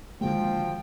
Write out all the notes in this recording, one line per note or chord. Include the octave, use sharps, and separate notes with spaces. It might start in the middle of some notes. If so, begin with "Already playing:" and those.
D3 D#3 F3 G#3 A#3 F#4 G5